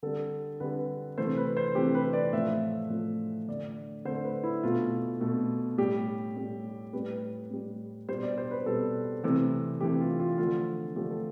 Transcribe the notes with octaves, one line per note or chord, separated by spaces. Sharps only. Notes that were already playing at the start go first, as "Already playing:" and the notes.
D3 G3 A4
D3 G3 B4
C3 E3 A3 C5
B4
C5
C3 E3 A3 G4
B4
D5
A2 F3 A3 E5
A2 F3 A3
D3 A3 D5
D3 A3 C5
B4
E4
B2 A3 F4
B2 A3
A2 G3 G4
A2 G3
A2 G3 B4
A2 G3
B2 G3 C5
D5
C5
B4
B2 G3 A4
C3 E3 A3
C3 E3 A3 G4
F4
F4
D3 F3 A3 F4
D3 F3 A3 G4
A4